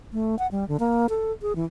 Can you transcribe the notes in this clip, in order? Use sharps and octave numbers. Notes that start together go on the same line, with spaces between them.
A3
F#5
G3
D3
A#3
A4
G#4
E3